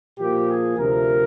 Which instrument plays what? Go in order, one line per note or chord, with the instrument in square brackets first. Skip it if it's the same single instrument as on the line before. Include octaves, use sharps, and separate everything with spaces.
[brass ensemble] A#2 F3 A#3 G4
G#4
D2 C3 F3 A#4